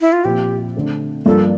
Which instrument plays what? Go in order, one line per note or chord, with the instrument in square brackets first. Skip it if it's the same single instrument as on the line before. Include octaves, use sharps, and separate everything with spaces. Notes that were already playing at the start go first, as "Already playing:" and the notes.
[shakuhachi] E4
F4
[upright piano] A#2 F3 C4 [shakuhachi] G4
[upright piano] D3 A3 C4
[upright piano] G2 F3 A#3 F4 [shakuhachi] A4